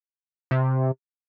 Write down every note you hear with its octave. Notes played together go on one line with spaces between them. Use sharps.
C3